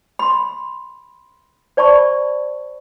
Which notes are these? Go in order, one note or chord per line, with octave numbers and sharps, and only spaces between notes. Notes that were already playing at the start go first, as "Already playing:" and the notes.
B5 C6
C5 D5 A5 B5 C#6